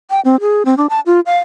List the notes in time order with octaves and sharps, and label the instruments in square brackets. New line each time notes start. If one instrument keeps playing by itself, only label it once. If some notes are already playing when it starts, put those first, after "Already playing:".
[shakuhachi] G5
C4
G#4
C4
D4
A5
F4
F5